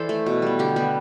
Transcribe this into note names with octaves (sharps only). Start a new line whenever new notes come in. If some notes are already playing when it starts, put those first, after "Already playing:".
Already playing: E3 A4 C5 D5
A3
B2
G3 B3
D3 G4
G3 B3